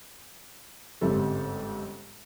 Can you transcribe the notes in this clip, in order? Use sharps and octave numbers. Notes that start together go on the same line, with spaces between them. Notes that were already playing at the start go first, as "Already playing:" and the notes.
G1 G#2 C4 C#4 G4 A4